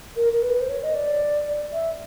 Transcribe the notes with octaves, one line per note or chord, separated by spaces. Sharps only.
A#4
A#4
B4
C5
C#5
D#5
D5
E5